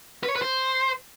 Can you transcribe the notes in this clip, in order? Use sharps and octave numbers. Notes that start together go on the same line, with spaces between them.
B4
C#5
B4
C5